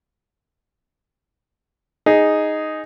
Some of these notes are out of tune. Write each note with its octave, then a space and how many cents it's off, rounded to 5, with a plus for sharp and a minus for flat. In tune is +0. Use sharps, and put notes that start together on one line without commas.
D#4 +0 G#4 +0